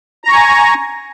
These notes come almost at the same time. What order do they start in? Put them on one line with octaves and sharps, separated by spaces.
A#5 C#6 G#5